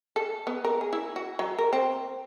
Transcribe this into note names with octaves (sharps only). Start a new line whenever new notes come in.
A4
B3
A#4
G#4
E4
F#4
F#3
A#4
C4